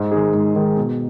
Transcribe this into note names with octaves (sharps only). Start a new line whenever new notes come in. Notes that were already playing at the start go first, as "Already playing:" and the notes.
Already playing: G#2
D#3 G#3 D#4 G#4
G#2
D#3 G#3 D#4 G#4
B2